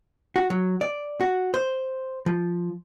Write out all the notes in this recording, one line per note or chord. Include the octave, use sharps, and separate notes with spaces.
F#4
F#3
D5
F#4
C5
F3